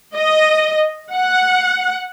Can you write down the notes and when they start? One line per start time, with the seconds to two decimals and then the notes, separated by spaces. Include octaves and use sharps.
0.16 D#5
1.12 F#5